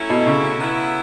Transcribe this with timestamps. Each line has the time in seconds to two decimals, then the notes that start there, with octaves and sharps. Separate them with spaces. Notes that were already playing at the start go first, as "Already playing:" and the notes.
Already playing: F#3 A3 C#4 E4
0.10 B2
0.27 C#3
0.61 F#3 B3 E4